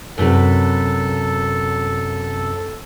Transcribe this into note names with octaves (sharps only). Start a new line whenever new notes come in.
F#2 C3 A4 B4